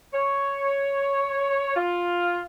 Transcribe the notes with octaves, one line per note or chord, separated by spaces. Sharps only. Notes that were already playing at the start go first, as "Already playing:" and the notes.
C#5
F4